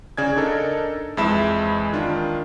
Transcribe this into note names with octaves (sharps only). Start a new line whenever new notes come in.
C#3 D5 G#5 G#6
D4 D#4 A4 A#4
F2 E3 G#3 E5 B5 E7
D#3 D4 F4